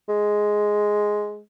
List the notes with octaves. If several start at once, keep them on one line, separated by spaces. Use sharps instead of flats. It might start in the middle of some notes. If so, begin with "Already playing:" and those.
G#3